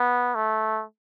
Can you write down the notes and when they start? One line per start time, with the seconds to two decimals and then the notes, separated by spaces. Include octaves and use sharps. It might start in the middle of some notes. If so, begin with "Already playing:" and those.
Already playing: B3
0.35 A3